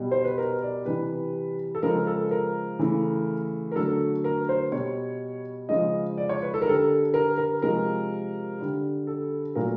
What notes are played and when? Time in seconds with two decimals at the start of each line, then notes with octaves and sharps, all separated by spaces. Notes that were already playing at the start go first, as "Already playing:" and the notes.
Already playing: B2 G3
0.11 C5
0.24 B4
0.38 A#4
0.62 D5
0.85 C3 E3 G3 B4
1.75 A4
1.83 C#3 F3 G#3 A#4
2.07 A4
2.31 A#4
2.79 C#3 E3 A3
3.72 A#4
3.76 D3 F#3 A3 A4
4.24 A#4
4.49 C5
4.72 B2 G3 C#5
5.69 C#3 F3 G#3 D#5
6.18 D5
6.29 C#5
6.42 B4
6.54 A4
6.62 A#4
6.66 D3 G3 A4
7.14 A#4
7.38 A#4
7.62 C3 F3 G#3 A#4
8.60 D3 G3
9.07 A4
9.55 A#2 F#3 A3 A#4